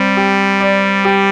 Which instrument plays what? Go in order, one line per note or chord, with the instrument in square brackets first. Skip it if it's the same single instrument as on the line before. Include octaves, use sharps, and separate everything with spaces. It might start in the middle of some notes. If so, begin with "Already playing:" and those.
Already playing: [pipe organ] G3 [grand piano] C4
[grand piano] G4
D5
G4